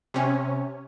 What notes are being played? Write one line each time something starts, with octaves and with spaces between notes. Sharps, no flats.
C3 C#4